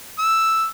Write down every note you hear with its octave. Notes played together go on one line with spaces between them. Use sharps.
E6